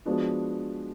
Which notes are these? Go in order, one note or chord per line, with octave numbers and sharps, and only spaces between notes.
F3 G#3 B3 D4 F#4